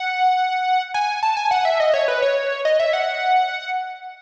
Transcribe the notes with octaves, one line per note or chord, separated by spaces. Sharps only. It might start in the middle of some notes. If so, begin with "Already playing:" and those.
Already playing: F#5
G#5
A5
G#5
F#5
E5
D#5
C#5
B4
C#5
D#5
E5
F#5